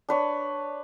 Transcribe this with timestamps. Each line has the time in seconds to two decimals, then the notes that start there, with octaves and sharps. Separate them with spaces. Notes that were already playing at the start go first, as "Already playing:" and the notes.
0.09 D4 B4 C#5